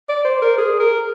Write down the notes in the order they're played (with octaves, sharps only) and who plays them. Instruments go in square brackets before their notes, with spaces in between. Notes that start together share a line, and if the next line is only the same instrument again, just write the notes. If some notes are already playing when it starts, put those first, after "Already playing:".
[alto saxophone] D5
C5
A#4
G#4
A#4